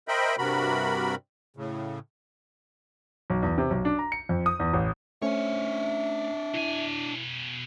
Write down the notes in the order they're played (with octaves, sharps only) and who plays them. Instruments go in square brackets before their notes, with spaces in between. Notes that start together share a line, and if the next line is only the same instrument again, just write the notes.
[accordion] A#4 C5 D#5 E5 G5 B5
G2 C3 F#4 A#4 B5
A2 C#3
[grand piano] B1
E2
C3
B1
D4
A#5
C#7
F2
D#6
E2
A1
[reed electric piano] A3 C#4 C5 [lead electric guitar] D4 C#5 [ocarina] E5
[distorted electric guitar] B2 G#5 [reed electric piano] E4